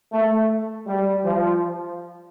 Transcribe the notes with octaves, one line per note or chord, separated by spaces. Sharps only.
A3
G3
F3